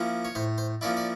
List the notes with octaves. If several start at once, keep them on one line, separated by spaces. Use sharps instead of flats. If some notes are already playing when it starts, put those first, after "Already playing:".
Already playing: F3 A#3 C#4 E4
C#5
A2 C5
C5
F3 A#3 C#4 E4 D5
D5